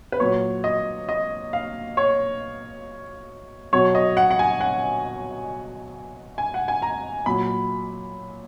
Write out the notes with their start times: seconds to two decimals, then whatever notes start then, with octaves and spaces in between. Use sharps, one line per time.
0.12 B4
0.20 A#2 F#3 C#5
0.64 D#5
1.09 D#5
1.53 F5
1.97 C#5
3.73 B2 F#3 C#5
3.95 D#5
4.17 F#5
4.31 F#5
4.39 G#5
4.61 F#5
6.38 G#5
6.54 F#5
6.68 G#5
6.82 A#5
7.26 A#2 F#3 B5